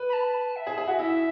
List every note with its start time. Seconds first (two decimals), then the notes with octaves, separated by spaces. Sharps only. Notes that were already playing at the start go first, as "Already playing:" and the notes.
Already playing: B4
0.09 B5
0.13 A5
0.56 E5
0.67 G#4
0.78 G#4
0.88 F#4
0.99 E4 E5